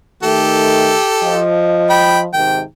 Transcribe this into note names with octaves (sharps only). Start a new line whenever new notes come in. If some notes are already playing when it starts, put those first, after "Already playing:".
D#3 A3 G4 A4
F3 D#5
G5 B5
G#2 C3 D#3 G5